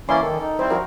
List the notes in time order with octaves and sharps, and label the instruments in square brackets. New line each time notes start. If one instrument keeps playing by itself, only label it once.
[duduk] E3 [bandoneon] A#3 C#4 E4 [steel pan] D5 C6
[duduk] D#3 [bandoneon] A4
[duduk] D#4
[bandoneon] G3 C4 E4 [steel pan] C5
[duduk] F3 [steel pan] F#4 A#4